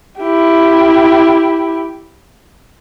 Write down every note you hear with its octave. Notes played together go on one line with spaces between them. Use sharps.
E4 G4